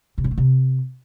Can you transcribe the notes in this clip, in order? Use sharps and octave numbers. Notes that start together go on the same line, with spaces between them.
C3
F#3
A3
C3